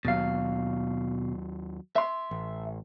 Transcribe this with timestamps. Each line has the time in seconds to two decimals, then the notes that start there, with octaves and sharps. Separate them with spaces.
0.05 D#2 B2 F#3 F5
1.96 E5 C6
2.31 A1